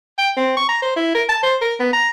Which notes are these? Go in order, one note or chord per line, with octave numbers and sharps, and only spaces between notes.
G5
C4
C#6
A#5
C5
E4
A#4
A5
C5
A#4
B3
A#5